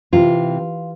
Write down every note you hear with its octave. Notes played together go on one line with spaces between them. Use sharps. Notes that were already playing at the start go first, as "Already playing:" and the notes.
C3 E3 F4